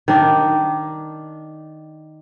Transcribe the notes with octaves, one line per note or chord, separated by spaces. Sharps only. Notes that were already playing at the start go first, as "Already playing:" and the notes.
D#3 D4